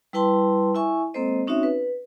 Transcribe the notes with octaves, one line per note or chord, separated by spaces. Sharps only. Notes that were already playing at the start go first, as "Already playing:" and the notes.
G3 E4 B4 G5 A5 C6
E4 E5 G#5 C#6
G#3 A#3 C4 A4 C5 D#5
C4 C#4 D#4 F#4 C#5 E5
B4